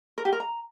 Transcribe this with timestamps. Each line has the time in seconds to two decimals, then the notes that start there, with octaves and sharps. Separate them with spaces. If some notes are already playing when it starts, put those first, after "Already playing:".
0.18 A#4
0.25 G4
0.33 A#4
0.40 A#5